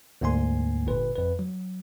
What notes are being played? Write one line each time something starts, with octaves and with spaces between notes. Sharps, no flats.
D2 G#2 A#3 G#5 C6
G1 A#2 B4
F2 B4
F#3